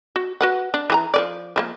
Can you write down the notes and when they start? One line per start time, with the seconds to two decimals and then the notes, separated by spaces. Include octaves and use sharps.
0.16 F#4
0.41 F#4 B4 F#5
0.74 D4
0.90 E3 G#4 A#5
1.14 F3 B4 D5
1.56 F3 G3 A#3